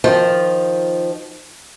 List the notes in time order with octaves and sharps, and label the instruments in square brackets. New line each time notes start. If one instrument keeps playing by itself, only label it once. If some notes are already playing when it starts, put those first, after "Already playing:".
[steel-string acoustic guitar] D#3 F3